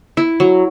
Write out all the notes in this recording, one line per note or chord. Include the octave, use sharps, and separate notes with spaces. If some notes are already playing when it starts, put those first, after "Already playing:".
E4
F#3